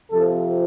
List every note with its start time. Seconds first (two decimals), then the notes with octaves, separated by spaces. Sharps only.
0.11 F2 C3 F3 A4